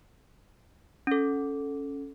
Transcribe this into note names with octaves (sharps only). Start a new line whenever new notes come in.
C#4 A4